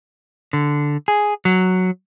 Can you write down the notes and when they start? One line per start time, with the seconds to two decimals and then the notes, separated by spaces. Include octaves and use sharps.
0.53 D3
1.08 G#4
1.45 F#3